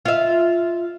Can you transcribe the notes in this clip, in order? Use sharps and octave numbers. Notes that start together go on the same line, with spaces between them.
F4 E5